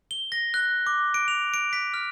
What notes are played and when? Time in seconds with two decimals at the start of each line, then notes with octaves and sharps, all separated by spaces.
0.11 G7
0.32 A#6
0.54 F#6
0.87 D6
1.14 D7
1.28 F7
1.54 D7
1.73 B6
1.94 F6